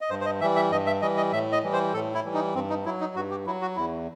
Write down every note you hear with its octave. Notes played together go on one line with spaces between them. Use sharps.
D#5
G2 C5
C5
D#5
E3 G3 E5
E5
G2 D#5
E5
E3 G3 D#5
D#5
A2 E5
D#5
E3 G3
C5
A2 A4
E4
E3 G3
D#4
G2 C4
D#4
F#3 E4
D#4
G2 F#4
G4
F#3 E4
F#4
E2 E4